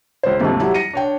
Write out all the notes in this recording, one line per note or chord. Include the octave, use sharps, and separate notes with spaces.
C#2 C5
D#2 G#2 C3 F3 A3
F#3 G3 E4
A#6 C#7 D#7
D4 C#5 G5